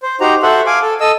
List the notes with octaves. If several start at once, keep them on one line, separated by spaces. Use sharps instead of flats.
C5
D#4 F#4 G4 C5 A#5
F#4 A4 C5 E5 F#5
F5 G#5 D6
A4
A4 D#5 E6